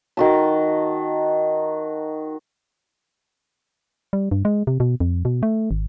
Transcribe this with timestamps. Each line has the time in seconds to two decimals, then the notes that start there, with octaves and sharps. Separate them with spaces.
0.17 D#3 F#4 A5
4.13 G3
4.31 G2
4.45 G#3
4.67 C3
4.80 B2
5.00 F2
5.25 B2
5.43 A3
5.71 G#1